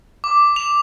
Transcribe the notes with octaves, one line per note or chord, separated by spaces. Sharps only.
D6
F7